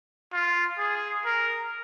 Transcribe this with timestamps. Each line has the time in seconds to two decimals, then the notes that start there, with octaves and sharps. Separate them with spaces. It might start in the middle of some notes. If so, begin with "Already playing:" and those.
0.33 F4
0.78 G#4
1.25 A#4